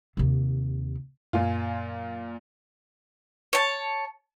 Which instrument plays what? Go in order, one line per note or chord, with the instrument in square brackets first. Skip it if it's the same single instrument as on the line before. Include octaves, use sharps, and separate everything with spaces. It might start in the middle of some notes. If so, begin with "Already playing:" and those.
[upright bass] D#2 C3
[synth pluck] F#2 F5 G#5 [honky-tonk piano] A#2 F4
[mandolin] C#5 A5